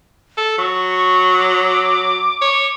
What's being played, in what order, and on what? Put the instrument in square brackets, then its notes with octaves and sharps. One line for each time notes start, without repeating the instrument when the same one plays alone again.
[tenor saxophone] A4
[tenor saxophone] F#3 [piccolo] C#6
[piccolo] D6
[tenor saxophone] C#5